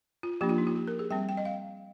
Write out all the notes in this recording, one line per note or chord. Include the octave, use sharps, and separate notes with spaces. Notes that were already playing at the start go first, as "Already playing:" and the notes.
F4
F3 A#3 D4 G4
F4
D#4
F4
G4
A#4
G#4
G3 C4 G5
G5
D#5
F5